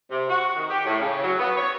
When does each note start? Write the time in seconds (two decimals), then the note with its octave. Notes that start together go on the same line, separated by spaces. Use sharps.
0.11 C3
0.29 F#4
0.55 D#3
0.70 G4
0.86 A2
1.00 C#3
1.24 F#3
1.40 B3
1.57 C#5